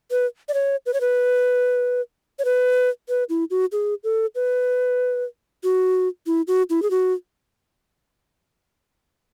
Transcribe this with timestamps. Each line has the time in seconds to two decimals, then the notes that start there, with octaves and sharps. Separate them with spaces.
0.11 B4
0.49 D5
0.54 C#5
0.86 B4
0.94 C#5
1.01 B4
2.39 C#5
2.45 B4
3.09 B4
3.29 E4
3.51 F#4
3.72 G#4
4.04 A4
4.35 B4
5.64 F#4
6.27 E4
6.48 F#4
6.70 E4
6.82 G#4
6.91 F#4